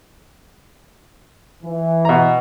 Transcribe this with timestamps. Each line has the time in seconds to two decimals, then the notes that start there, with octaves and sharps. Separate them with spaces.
1.63 E3
2.05 B2 A#5